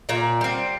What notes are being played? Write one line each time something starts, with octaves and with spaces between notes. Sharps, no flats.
A#2 D5
G3 C4